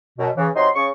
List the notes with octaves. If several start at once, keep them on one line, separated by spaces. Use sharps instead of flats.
F#2 B2
C#3 E3
C3 F#3 D#4 C6
C#3 C#6